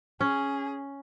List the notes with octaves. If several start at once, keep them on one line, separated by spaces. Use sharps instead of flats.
C#4 G#4